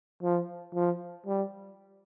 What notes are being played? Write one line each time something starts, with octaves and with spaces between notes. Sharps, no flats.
F3
F3
G3